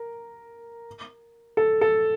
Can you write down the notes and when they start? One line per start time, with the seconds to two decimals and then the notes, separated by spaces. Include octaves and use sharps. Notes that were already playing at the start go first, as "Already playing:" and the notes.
Already playing: A#4
1.57 A4
1.81 A4